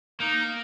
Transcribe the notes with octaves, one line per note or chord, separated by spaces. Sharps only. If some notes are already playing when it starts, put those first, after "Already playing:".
A#3 D#4